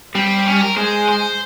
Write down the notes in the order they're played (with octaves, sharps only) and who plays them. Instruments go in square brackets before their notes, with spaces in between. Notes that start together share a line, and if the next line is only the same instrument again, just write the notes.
[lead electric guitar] G3 [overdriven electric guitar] C4
[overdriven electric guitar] C#4
A#4
[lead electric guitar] G#3 [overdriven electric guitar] C5
[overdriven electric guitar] C5